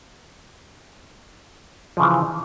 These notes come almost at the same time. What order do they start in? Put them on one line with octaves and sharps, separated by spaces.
F3 C#3 E3